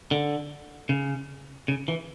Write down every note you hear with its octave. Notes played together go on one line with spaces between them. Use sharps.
D3
C#3
C#3
E3